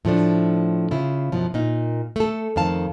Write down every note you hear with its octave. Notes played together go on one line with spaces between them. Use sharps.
A2 F3 A3 D4
C#3 E4 F4
F#2 B2 F3
A#2 A#3 D#4
A3 A4
F2 D#3 F5 A5